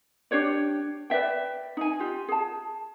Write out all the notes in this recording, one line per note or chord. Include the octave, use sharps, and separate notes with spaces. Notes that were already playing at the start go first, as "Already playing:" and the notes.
D4 G4 C#5 D5
B4 D5 E5 G5
D#4 G#5
F4 G4
G#4 A5